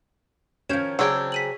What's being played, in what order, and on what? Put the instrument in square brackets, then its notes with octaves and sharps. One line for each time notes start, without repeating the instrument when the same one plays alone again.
[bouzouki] D#3 F3 [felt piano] C#4 [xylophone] G6 G#6 E7
[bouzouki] C#3 C4 [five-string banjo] F#3 D4 G4 [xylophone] E6 G#6 D7
[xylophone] B6 D#7 F#7